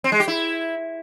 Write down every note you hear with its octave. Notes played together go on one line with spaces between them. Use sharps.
C4
G#3
G4
E4